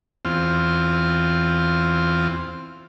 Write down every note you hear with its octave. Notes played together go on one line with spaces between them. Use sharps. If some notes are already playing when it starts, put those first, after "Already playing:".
E2 C4 F4